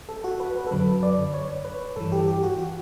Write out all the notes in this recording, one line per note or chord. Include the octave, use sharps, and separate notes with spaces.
A4
F#4
B4
B4
A4
F#2 D3 F#3 B4
D5
C#5
B4
G2 E3 A4
G4
G4
F#4
F#4